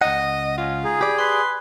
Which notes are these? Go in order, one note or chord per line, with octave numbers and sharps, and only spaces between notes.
C#2 D#5 F#5
C#4 F4
D#4 G#4
G4 D5 G5 B5
B4 C6